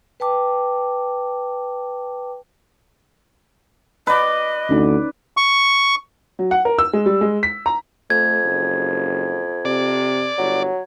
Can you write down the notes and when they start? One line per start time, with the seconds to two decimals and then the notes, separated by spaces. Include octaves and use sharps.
0.20 B4 G5 A5 D6
4.07 B4 D5 D#5
4.69 D2 C#4 D#4
5.37 C#6
6.39 F#3
6.51 F#5
6.65 A#4
6.79 E6
6.93 G#3
7.06 G3
7.21 G#3
7.43 B6
7.66 A#5
8.10 F2 A3 G#6
8.44 F#1
9.65 C3 D5
10.38 G1 F#3